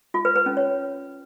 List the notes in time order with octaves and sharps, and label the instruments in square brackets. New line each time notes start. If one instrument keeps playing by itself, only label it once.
[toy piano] F4
B4
B4
C#4
C#5